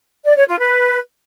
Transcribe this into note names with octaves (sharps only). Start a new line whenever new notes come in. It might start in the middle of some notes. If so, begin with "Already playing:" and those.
D5
C#5
F4
B4